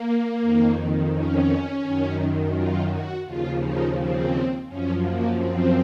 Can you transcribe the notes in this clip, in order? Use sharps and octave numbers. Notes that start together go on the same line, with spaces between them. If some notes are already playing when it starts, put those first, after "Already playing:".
Already playing: A#3
F2 D#3
C#4
F#2 D#3
F4
F#4
D#2 C#3 F3 F4
D#4
C4
F#2 F3 C#4
A#3
C4